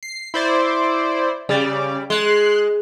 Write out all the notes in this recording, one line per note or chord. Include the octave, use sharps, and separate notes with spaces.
C7
E4 C5 D5
C#3 G3 D5
G#3 C6 F#6